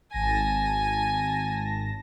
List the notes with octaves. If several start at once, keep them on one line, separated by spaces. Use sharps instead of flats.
G#1 G#5 A5 A#6